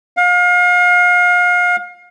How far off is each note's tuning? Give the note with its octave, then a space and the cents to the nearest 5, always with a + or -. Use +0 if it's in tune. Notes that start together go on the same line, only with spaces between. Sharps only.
F5 +35